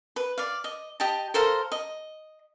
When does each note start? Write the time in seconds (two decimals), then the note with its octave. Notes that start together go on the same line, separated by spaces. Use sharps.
0.16 B4
0.38 D5 F5
0.64 D#5
1.00 G4 D#5 G5 A5
1.34 A4 A#4 C5 F5
1.72 D#5